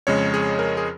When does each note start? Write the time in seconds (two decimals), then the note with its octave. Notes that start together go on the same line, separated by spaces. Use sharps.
0.07 F2 C#3 G#3 C#5
0.34 G#4
0.59 A#4
0.77 G#4